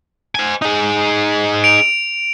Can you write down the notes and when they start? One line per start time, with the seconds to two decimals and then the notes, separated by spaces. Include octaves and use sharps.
0.35 C5 G#5
0.62 D#4 G#4
1.64 D7 F7